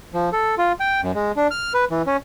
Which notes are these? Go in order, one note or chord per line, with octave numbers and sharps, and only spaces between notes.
F3
A4
F4
G5
F#2
G#3
D4
F6
B4
E3
C#4